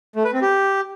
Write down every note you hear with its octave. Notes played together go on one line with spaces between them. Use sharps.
A3
B4
C4
G4